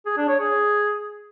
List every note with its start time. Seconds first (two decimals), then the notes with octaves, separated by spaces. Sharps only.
0.06 G#4
0.17 D4
0.29 C#5
0.40 G#4